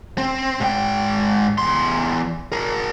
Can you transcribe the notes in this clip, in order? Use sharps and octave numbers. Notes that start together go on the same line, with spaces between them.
C4
G#2 G5
E2 C6
G#4 A#4